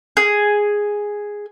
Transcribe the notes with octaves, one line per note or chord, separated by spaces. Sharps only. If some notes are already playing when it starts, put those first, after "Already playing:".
G#4